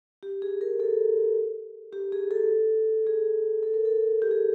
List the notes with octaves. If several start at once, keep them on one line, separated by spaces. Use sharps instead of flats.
G4
G#4
A#4
A4
G4
G#4
A4
G#4
A4
A#4
A4
G4
G#4